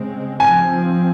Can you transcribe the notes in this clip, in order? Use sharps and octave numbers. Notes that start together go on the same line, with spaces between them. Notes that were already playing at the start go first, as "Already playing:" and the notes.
Already playing: C#3 G#3 C4
F3 C4 G#5